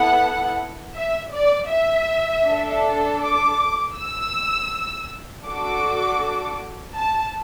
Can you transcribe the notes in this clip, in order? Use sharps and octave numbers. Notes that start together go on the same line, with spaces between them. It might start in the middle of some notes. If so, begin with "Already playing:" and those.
Already playing: B3 E4 A4 F#5
E5
D5
E5
D4 A4
D6
E6
D4 F#4 A4 D6
A5